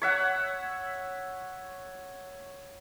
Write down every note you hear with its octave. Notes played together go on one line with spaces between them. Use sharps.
C#5 E5 F#5